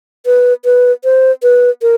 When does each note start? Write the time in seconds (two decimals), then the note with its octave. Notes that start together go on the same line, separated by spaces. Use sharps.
0.26 B4
0.65 B4
1.04 C5
1.43 B4
1.82 A#4